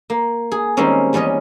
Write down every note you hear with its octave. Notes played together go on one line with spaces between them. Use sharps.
A#3
G#4
D#3 G3 G#3 A#3 C4 C#4
E2 G3 C#4 C#5 D#5